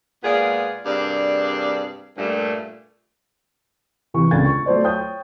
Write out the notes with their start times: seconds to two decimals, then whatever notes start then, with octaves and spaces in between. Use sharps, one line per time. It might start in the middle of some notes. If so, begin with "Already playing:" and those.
0.24 A#2 G#3 B3 G#4 D5 F5
0.86 G2 C3 A#3 D4 G#4 D5
2.18 G2 A#2 A3
4.14 C3 E3 C#6
4.31 C#2 D3 B3 G#6 A6
4.46 C#6
4.66 F#3 A3 C5 D5
4.84 C#5 G5 D#6 G6